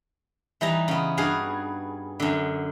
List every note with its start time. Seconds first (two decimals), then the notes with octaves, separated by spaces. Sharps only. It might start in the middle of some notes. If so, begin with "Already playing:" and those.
0.61 E3 G3 D#4 A#5
0.88 C#3 B3
1.18 G2 F#4 G#4 F5
2.20 F#2 D3